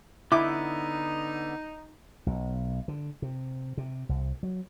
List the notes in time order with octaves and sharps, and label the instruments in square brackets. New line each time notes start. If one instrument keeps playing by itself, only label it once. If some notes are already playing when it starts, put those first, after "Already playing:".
[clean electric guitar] D3 B3 [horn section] D#4 [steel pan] E4 [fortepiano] D6
[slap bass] B1
D3
C3
C3
C2
F#3